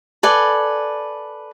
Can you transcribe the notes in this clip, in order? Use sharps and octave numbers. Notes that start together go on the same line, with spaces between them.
A4 B4 D5 G#5